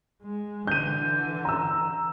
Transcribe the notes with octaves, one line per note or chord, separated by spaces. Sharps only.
G#3
D3 E3 G6 D#7
A#5 E6